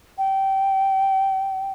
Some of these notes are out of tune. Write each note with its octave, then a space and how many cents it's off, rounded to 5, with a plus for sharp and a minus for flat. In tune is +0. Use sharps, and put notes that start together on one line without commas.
G5 -15